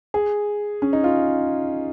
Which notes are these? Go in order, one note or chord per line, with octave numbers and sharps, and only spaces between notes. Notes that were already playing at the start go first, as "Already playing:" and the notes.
G#4
C#4
D#4
F4